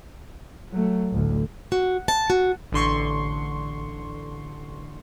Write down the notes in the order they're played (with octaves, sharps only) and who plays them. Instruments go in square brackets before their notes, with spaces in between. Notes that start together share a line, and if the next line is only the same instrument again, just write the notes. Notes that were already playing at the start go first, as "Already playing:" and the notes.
[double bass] F#3 A3
A1 D2
[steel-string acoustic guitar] F#4
A5
F#4
[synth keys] A1 D3 C6 C#6